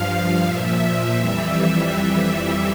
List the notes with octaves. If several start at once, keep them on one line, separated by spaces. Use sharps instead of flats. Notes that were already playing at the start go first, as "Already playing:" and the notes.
Already playing: G2 F3 F5
A#2 F3 E5
F2 E3 G3